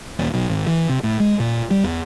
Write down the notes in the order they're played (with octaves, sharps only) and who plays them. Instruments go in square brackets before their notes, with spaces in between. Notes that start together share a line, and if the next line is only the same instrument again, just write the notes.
[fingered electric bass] D#1
B1
G#1
E3
C3
A2
G#3
A#2
G3
E2